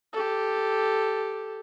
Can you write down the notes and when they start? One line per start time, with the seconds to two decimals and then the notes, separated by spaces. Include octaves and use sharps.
0.13 G4 A4